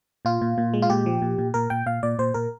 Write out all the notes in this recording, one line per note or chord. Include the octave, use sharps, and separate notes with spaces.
A#2 F4
A#2
A#2
G#3
F4
A#2 G4
F3
A#2
A#2
A#2 A#4
A#2 G5
A#2 F5
A#2 D5
A#2 C5
A#2 A#4